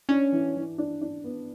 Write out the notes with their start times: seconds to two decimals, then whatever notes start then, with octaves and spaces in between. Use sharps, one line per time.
0.09 C#4 D4
0.32 E3
0.56 E3
0.78 D4
1.01 D4
1.24 B3